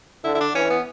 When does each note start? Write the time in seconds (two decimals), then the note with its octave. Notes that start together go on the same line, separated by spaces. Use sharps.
0.24 D3 E4
0.35 E4
0.40 D4
0.55 E3 C#4
0.70 B3